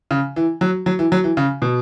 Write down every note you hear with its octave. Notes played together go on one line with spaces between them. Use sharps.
C#3
E3
F#3
F#3
E3
F#3
E3
C#3
B2